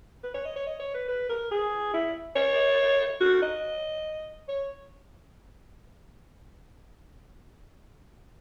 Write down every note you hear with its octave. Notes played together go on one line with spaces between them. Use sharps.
B4
C#5
D#5
C#5
D#5
C#5
B4
B4
A#4
G#4
E4
C#5
F#4
D#5
C#5